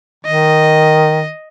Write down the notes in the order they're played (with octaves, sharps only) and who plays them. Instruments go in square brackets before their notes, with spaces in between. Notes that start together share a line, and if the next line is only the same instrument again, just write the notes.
[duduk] D#3 [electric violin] D#5